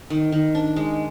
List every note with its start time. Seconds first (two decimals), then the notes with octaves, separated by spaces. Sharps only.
0.10 D#3
0.32 D#3
0.55 D4
0.76 G#3